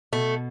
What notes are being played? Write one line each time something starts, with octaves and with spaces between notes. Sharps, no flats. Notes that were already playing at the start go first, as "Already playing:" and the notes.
B2 A3